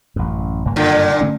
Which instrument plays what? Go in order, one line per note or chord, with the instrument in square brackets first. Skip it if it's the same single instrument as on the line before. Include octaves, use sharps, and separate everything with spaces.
[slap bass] A1 F#2
F#1 G2 A#3
[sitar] A#2 D3
[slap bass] D3 A3 C#4